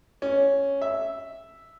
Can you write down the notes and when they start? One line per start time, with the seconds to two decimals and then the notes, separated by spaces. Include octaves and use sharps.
0.22 C#4
0.81 E5